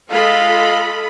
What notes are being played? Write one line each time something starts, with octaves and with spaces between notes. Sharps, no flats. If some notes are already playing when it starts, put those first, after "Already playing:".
G#3 F4 A4 D#5 F5 B5